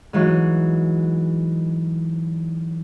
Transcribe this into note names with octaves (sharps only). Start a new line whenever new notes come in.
G#2 E3 F#3